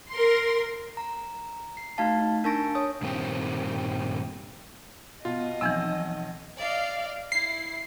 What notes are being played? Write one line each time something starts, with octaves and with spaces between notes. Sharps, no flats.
A#4 C6
A#5
C7
A3 D#4 F#4 F5 A5
D#4
D4 A#4 A5 C#6 A#6 D7
C#5 D#6
G2 A#2 D#3 C4 G4
B2 F4 D#5
B1 E3 F3 C4 G#5 E6
D5 D#5 F5
E4 C7